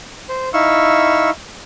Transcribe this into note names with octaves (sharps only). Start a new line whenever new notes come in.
C5
D#4 E4 F5 C#6 E6